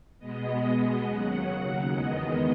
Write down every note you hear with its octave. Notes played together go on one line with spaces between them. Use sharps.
B2 G#3 B3 D#5
D#5
D#2 C#3 F#3 F#5
E2 D#3 G#3 B3 D#5